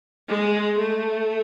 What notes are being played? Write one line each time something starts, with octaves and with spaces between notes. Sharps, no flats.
G#3
A3